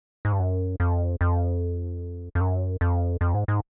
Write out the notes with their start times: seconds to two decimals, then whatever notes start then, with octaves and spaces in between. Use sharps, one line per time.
0.25 G#2
0.32 G2
0.40 F#2
0.80 F2
1.21 F2
2.35 F2
2.41 F#2
2.81 F2
3.21 F2
3.34 G#2
3.48 G#2